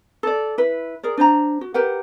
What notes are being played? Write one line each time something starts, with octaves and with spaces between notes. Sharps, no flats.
A4 D5
E4 B4
G#4 A#4 D5
D4 C5 C#5 A#5
F#4
G4 A#4 B4 F#5